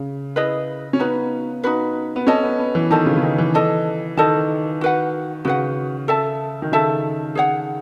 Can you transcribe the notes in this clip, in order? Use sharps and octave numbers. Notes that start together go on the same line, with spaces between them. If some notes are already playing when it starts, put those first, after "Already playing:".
Already playing: C#3
E4 G#4 B4 D#5
C#4
B3 D#4 F#4 B4
D#4 F#4 B4
B3
C#4 A4 D#5 A5
B3
B3
E3
D#3 A4 D#5 A5
C#3
C#3
D#3
E3
A4 D#5 A5
D#3 A4 D#5 A5
F#4 B4 F#5
C#3 F#4 B4 F#5
A4 E5 A5
D#3
C#3 A4 E5 A5
G#4 C#5 F#5